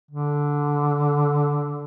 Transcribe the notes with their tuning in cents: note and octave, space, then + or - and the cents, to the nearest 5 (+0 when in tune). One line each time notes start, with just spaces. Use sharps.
D3 -10